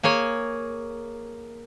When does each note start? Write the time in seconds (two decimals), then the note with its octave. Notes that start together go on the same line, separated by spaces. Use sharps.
0.03 A#3 G#4 C#5 G#5